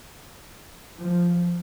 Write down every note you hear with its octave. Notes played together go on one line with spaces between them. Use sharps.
F3